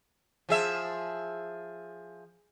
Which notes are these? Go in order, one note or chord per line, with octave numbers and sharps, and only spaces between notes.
F3 G#4 E5